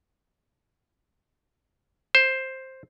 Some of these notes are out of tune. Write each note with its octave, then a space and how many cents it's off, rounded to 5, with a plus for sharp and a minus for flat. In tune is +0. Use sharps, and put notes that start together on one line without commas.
C5 +10